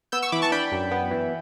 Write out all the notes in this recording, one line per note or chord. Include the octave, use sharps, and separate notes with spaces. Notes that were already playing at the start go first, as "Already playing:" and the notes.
B3 E6 G6
C#6 E6
E3 B5 D6
A5 C#6
D4 G5 B5
F#2
B3
E3